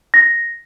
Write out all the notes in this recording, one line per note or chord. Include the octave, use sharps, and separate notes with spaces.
A#6